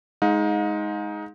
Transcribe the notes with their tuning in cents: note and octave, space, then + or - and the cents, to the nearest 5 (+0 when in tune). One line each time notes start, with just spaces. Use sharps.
G#3 +10 D#4 +15 F5 +45